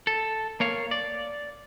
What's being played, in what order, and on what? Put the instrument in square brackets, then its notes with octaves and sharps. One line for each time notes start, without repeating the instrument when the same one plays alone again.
[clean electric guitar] A4
A#3 C#5 F5
D5